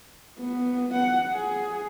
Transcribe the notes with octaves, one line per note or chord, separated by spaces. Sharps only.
B3
F#5
G#4